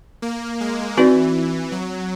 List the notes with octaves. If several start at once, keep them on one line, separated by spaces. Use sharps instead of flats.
A#3
G#3
E3 C4 D#4 F#4 B4 D5
F#3